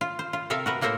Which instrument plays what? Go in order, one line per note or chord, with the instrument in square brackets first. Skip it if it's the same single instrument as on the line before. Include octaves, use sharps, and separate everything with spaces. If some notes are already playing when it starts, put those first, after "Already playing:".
[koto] F4
C5
F4
C3 A4 A#4 E5 F5
F#4 A#4 B4
A2 A#3 A4 A#4 C5